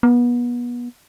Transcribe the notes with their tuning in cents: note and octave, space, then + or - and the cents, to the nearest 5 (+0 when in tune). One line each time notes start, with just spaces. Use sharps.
B3 -30